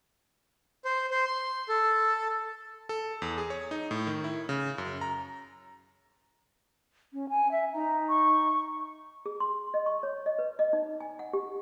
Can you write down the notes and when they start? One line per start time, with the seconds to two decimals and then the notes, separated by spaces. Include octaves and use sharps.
0.85 C5
1.10 C5
1.25 C6
1.69 A4
2.89 A4
3.22 E2
3.38 G#4
3.50 C#5
3.71 D#4
3.91 A2
4.07 D#3
4.24 E4
4.49 C#3
4.78 F#2
5.01 A#5
7.13 C#4
7.29 G#5
7.52 E5
7.74 D#4 A#5
8.09 C#6
9.26 G#4
9.40 C6
9.74 D#5
9.86 C#6
10.03 C#5
10.26 D#5
10.39 B4
10.59 D#5
10.73 D#4
11.00 G#5
11.19 F#5
11.33 G4